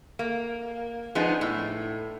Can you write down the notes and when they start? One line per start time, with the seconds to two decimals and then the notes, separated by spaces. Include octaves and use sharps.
0.19 A#3
1.15 F3 G#3 B3 D4 D#4
1.41 A2